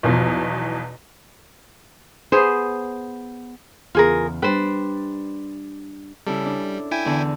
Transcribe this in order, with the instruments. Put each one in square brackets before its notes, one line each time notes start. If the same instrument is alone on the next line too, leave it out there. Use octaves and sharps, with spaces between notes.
[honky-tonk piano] B1 E2 B2 F3
[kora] B3 G#4 C5
[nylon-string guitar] E2 C#3 [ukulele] F4 G#4 A#4
[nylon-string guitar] G3 D4 G5 [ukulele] B4 C5
[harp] C#3 E4 A4 [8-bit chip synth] G3
[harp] D4
[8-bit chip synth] E4 G5 G#5
[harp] E2 D3